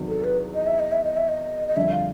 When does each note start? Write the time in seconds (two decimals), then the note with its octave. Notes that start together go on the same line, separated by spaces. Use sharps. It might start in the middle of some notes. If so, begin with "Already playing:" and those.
Already playing: E2 C3 D#3 F#3
0.08 A4
0.24 B4
0.55 D#5
0.67 E5
0.79 D#5
0.92 E5
1.04 D#5
1.17 E5
1.28 D#5
1.68 D#5
1.76 F2 D3 G3 E5
1.92 F5